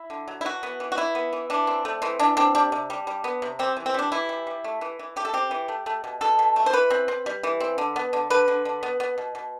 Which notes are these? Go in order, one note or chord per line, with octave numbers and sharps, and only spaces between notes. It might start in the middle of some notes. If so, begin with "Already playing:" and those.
Already playing: E4
D3
F#3
E4
E3 F#4
B3
E3
F#4
E3 E4
B3
E3
E3 D4
C4
A3
E3 C4
E3 D4
C4 D4
G3 D4
C3
G3
G3
B3
C3
G3 C4
E3
C4
G3 D4
E3 E4
G3
G3
A3
E3
E3
A3 G4
A4
C4 G4
E3
A3
A3
B2
B2 A4
B2
A3
C5
E3 B4
C4
C4
G3
E3
C4
D3
B3
D3
D3 B4
D3
D3
B3
B3
B2
B2